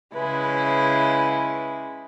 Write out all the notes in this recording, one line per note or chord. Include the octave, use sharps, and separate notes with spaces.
C#3 G#3 E4 B4